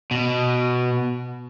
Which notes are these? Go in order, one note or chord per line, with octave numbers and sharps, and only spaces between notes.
B2